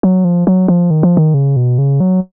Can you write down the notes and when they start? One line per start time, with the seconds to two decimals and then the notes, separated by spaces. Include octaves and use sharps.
0.03 F#3
0.25 F3
0.47 F#3
0.68 F3
0.91 D#3
1.03 F3
1.17 D#3
1.34 C#3
1.56 B2
1.78 C#3
2.00 F#3